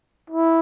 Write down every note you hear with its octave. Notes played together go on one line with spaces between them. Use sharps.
E4